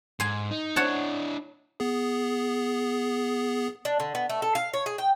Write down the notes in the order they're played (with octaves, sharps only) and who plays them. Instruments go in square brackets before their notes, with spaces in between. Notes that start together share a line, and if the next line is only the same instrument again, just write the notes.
[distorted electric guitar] G#2 [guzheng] G#5 C6
[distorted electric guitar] D#4
[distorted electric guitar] D4 E4 [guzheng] C#5 F#5 A5
[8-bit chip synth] B3 G#4
[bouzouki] D4
D3
B3
A3
A4
F5
C#5
G#4
G5